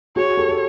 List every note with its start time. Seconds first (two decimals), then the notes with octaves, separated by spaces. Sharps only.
0.16 F#4 G#4 C#5
0.37 G4 A4
0.49 A4